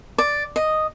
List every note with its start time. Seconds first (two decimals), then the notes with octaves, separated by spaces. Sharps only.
0.18 D5
0.56 D#5